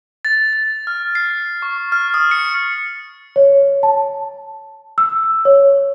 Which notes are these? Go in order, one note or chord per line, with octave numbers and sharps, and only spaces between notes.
A6
A6
F6
C7
C#6
F6
D#6
C#7
C#5
A5
E6
C#5